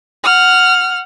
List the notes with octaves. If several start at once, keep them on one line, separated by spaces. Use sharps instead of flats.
F#5 F6